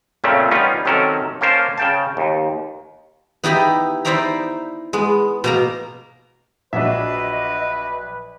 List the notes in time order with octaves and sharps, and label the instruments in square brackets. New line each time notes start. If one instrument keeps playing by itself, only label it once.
[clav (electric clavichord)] A#2 C#3 A3 C4 C#4
G3 B3 C#4 D#4 F4
C3 D#3 F#3 C#4 A4 A#4
A#3 C#4 A#4 C5 A5
C#3 G5 A5
D#2
[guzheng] B3 D#4 E4 G4 D#5 B5
D#4 E4 C5 D5 E5 A#5
G#3 B3
B2 A#3 A#5
[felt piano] A#1 F#3 [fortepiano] D4 F#4 E5 [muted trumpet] B4 [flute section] D#5